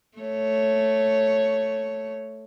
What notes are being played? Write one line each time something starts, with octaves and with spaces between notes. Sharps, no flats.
A3 C#5